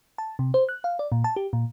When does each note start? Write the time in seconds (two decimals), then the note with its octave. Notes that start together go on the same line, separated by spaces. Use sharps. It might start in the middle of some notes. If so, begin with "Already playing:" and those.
0.18 A5
0.39 C3
0.54 C5
0.69 F#6
0.84 F5
0.99 D5
1.12 A#2
1.24 A5
1.36 G4
1.53 A#2